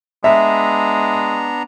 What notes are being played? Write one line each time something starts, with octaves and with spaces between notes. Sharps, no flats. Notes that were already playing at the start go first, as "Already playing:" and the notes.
G#3 B3 D4 E5 A#5